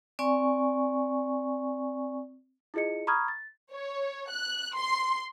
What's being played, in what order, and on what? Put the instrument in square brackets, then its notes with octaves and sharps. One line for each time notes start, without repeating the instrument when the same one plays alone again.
[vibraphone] C4 D5 G#5 C#6
[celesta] E4 F4 G#4 D#5 C#7
A#5 B5 C#6 D#6 F6 G#6
A6
[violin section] C#5
F#6
C6